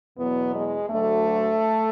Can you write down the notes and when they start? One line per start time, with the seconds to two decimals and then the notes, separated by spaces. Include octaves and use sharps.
0.17 E2 B2 F#3 B3
0.54 G#3
0.90 D2 D3 F#3 A3